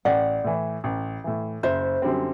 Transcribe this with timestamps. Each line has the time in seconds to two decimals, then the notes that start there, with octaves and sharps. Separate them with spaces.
0.05 A1 D5 F#5
0.44 A2 E3
0.84 A1
1.24 A2 E3
1.63 F#1 C5 E5
2.02 F#2 D3 G3 C4